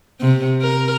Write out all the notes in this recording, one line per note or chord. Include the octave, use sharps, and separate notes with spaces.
C3
A#4